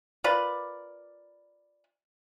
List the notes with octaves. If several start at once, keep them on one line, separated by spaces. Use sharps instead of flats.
F4 A#4 B4 D5